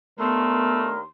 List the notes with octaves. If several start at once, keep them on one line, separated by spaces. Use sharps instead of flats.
D#2 A3 B3 D4 A#4 C6